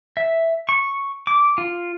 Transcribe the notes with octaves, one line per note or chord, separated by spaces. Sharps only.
E5
C#6
D6
F4